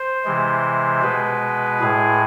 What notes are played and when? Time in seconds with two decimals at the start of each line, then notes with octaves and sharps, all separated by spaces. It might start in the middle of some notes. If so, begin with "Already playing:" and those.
Already playing: C5
0.25 C3 E3 G#3
1.02 B2 G#3 B4
1.81 A2 G#3 G#4